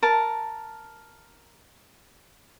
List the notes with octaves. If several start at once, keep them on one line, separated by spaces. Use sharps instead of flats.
A#4 A5